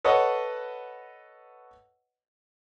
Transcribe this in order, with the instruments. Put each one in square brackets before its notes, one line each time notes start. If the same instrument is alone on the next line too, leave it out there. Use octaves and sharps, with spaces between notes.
[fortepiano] A4 B4 C#5 D#5 F#5